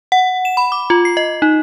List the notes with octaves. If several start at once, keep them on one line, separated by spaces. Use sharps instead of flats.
F#5
E7
B5
D6
F4
C7
D#5
D#4